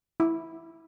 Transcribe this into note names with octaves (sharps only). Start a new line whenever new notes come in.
E4